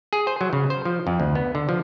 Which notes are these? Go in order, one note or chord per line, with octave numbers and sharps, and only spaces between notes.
G#4
C5
F#3
C#3
C5
F3
F2
D2
B3
D3
F3